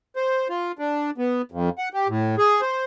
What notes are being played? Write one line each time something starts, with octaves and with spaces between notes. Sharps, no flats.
C5
F4
D4
B3
F2
F#5
G4
A2
G#4
C5